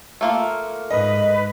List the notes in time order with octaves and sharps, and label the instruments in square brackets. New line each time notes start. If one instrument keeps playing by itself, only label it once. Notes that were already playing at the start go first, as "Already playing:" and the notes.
[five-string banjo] A3 A#3 F4
[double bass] G#2 [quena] B4 [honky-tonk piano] D#5